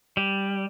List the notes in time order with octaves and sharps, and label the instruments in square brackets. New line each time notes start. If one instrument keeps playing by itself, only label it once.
[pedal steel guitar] G3